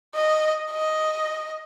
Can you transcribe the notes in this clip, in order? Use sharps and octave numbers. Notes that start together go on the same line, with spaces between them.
D#5
D#5